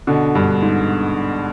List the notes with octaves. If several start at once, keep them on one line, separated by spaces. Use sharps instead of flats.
B2 D3
G2
G#2